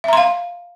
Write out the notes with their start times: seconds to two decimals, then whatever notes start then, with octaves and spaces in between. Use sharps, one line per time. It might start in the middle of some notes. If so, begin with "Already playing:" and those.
0.04 E5
0.08 A#5
0.13 C6
0.17 F5